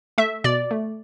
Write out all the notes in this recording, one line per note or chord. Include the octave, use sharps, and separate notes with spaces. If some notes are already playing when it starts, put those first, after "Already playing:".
A3 E5
B2 D5
A3